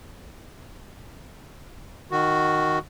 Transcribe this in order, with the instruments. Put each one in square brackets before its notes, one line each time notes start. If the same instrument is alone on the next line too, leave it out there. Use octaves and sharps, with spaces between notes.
[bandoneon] D#3 F#4